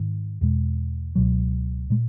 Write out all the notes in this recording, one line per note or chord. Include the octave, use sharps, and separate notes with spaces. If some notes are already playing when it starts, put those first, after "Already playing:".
Already playing: G#2 D#3
E2 B2 G#3
C#2 B2 F#3
A#2 G#3